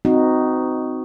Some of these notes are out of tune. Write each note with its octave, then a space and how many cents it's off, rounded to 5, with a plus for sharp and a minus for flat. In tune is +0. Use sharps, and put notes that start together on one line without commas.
C4 -35 D#4 +0 F#4 +0